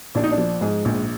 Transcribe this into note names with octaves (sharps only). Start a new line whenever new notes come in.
A#1 D4
D#4
D4
F3
G#2 G#4
A#1